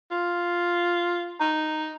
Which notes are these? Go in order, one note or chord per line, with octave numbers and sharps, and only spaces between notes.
F4
D#4